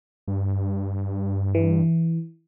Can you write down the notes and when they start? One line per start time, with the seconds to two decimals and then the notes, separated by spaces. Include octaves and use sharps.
0.28 G2
1.55 E3